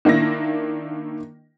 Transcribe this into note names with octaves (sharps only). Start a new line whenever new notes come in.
D#3 A#3 D4 E4 A#6